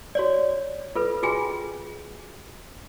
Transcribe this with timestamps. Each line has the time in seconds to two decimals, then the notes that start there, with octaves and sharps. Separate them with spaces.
0.15 F#4 C#5 D5
0.96 F4 A4 B4
1.23 F4 F#4 G#4 G5 G#5